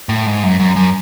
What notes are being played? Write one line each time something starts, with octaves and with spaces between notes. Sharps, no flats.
A2
G#2
F#2
F#2
F#2